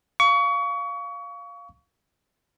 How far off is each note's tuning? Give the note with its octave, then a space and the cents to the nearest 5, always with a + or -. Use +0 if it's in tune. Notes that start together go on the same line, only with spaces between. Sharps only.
F5 +0 C#6 +30